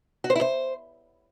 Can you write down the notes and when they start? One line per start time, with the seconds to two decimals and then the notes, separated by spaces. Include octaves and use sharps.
0.24 F#4
0.30 C5
0.36 E4
0.41 C5